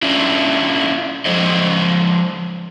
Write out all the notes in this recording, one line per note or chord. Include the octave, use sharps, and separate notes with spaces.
C#4 D4 E4 F4
F3 G#3 C5 D#5